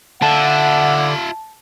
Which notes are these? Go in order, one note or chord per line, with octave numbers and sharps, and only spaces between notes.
D3 F4 E5 F#5 A5